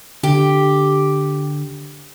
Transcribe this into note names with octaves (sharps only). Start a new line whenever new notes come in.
D3 G4